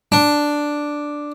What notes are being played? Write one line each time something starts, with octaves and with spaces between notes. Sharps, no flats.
D4